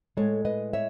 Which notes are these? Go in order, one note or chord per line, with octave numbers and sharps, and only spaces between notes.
A2 G#3 A4 C#5
B4 D#5
C#5 E5